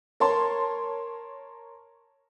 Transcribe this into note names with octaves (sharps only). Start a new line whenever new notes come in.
A#4 C#5 A5 C6